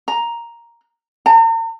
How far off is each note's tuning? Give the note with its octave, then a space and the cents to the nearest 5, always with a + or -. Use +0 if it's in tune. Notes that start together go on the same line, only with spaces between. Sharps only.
A#5 +5
A#5 -45